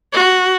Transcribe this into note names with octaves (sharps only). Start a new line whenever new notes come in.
F#4